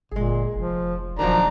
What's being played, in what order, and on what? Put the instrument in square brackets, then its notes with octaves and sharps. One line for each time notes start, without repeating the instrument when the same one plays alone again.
[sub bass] G1 [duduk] A#2 [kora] G#3 G#4
[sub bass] F1 [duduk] F3
[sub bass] D#1 [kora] D#3 F#3 A#3 [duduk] F3 [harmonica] D4 A#5